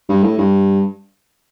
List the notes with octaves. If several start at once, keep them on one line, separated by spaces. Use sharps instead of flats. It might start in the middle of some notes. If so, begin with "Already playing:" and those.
G2
A2
G2